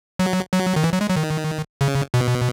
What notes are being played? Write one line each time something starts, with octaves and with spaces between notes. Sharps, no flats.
F#3
F#3
D#3
E3
F#3
G#3
F#3
D#3
C#3
B2